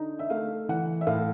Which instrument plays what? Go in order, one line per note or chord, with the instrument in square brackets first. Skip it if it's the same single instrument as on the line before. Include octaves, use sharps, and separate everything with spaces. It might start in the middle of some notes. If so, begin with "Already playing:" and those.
Already playing: [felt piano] D3 D#4
E5
A3 F5
E3 F#5
E5
A2 F5